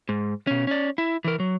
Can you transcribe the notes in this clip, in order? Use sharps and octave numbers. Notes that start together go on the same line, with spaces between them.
G#2
B2 C#4
C#4 D5
E4
E3 A#4
F#3